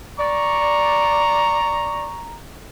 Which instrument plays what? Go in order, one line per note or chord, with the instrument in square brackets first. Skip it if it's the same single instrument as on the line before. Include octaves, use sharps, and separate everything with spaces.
[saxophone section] D5 [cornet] A#5 [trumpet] C#6